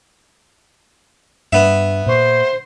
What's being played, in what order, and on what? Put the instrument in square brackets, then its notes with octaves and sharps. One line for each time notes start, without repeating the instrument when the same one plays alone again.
[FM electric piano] G2 D4 [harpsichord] B3 E5
[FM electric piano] A#2 C#6 [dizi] C5